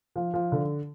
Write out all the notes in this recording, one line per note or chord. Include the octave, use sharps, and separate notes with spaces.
F3
F3
D3